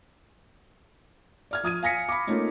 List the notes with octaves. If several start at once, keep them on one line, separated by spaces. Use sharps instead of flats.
D5 F6 G#6
F3 D#6 G#6 D#7
F5 G#5 A#6 B6 C#7
B5 D6
A3 A#3 C4 C#4 D#4 F4